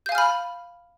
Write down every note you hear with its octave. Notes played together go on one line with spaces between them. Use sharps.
F5 G#5 B5 F6 G6